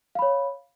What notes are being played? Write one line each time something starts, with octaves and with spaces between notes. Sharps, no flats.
C#5 F5 B5